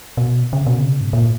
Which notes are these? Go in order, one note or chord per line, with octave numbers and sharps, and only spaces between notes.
B2
C#3
B2
C#3
G#2
A#2